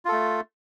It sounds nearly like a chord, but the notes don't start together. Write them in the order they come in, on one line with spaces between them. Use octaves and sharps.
F4 A4 A3